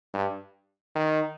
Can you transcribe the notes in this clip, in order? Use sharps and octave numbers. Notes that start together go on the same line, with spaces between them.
G2
D#3